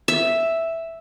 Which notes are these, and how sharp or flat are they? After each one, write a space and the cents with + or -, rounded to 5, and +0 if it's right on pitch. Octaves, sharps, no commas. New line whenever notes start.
E5 +0